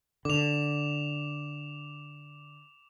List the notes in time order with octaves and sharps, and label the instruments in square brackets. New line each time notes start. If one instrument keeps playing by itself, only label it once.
[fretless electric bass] D3 [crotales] D6 F7